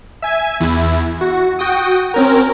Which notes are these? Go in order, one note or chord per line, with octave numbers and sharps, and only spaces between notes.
E5 G#5 G#6
E2 E4
F#4
F#4 G5 D#6
C4 C#4 A#4